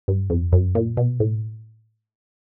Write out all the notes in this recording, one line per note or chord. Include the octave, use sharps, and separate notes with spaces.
G2
F2
F#2
A#2
B2
A2